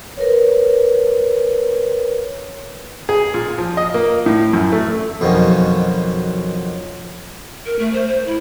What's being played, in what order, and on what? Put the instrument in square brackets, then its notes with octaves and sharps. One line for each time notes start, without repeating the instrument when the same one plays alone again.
[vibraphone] A#4 B4 C#5
[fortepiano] G#4
A#2
F3
D#5
A#3
A2
F#2
A3
[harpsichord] F2 B2 D#3 F3 F#3 C#4
[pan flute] A#4
A3
C5
C5
E4